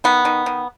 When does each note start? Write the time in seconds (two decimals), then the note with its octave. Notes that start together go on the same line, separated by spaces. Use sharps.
0.04 D#3 B3
0.25 D#3
0.46 D#3